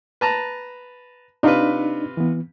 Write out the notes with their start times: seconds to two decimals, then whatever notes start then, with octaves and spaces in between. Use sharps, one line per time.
0.21 B4 A5 A#5
1.43 C3 D4 D#4 F4 B4
2.17 E3 B3